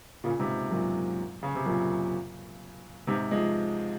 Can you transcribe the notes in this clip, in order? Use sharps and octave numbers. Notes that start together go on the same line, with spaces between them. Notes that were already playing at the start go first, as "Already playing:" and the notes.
A#2 C#3
G#2 C3
F#2 A#2
C#3
C3
F#2 A#2
G#2 C3
F3 G#3